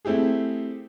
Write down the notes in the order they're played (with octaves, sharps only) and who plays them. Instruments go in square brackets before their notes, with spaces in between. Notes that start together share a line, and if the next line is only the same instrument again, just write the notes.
[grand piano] A3 C4 E4 G4 G#4